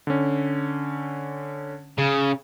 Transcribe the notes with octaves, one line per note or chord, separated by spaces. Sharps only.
D3 C#4
C#3